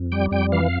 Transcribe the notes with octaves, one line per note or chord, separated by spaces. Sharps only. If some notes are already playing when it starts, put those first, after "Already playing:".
Already playing: F2
G3 G5
F2 G5
E3 F5